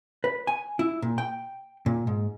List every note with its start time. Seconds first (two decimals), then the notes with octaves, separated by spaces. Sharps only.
0.24 B4
0.47 G#5
0.79 E4
1.02 A#2
1.18 G5
1.86 A#2
2.07 G#2